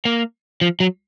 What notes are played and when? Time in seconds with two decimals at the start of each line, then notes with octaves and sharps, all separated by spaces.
0.05 A#3
0.61 F3
0.80 F#3